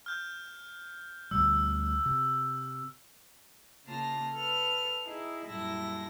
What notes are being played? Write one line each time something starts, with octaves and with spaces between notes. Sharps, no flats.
F6 G6
D2 B2 G3 E6
C3
C#3 A#3 F4 A5 F6 A#6
A4 B4 F6
D#4 E4 G#4
F#2 A#2 G3 E4 A4 A#6